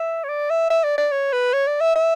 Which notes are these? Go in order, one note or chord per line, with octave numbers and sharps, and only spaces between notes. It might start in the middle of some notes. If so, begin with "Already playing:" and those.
Already playing: E5
C#5
D5
E5
E5
D5
D5
C#5
B4
C#5
D5
E5
E5